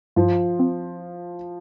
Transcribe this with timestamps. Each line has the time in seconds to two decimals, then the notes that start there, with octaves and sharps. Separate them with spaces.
0.16 G2 F3 F4
0.59 C4